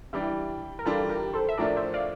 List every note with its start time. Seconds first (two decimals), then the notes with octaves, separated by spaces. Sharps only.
0.13 E3 G3 D4 E4 G4
0.79 A#4
0.85 E3 G3 D4 F4 A4
1.09 G4 A#4
1.34 A4 C5
1.49 E5
1.58 A2 F3 A3 D4 A#4 D5
1.76 C5 E5
1.94 D5 F5